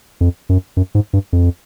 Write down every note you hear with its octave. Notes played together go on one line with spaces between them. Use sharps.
F2
F#2
F#2
G#2
G2
F2